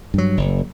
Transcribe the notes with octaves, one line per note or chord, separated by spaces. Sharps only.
G2 F#3
F#1